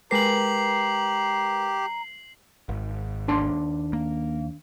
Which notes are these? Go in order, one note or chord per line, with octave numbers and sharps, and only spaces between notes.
G#3 G4 A#4 B4 A#5 C7 F#7
G#1
D#2 D4 C6
A#3